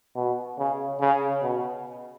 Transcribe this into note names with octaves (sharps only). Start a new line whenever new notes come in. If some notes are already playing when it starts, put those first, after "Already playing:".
B2
C#3
C#3
B2